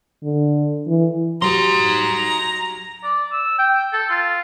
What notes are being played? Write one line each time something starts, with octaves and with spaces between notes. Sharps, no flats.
D3
E3
F#3 D#4 G4 A#5 C6
D5
E6
G5
A4
F4